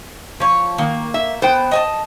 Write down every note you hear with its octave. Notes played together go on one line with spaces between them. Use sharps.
F3 C#5
D#3 A#3
E5
B3 C5 G5
D#5 G#5 A5